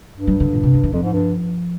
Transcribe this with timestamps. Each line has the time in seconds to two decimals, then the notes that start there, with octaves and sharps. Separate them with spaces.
0.14 G2
0.27 G3
0.40 D3
0.53 A#2
0.63 C3
0.74 D3
0.83 D#3
0.92 F2 F3
1.03 G#2
1.13 G2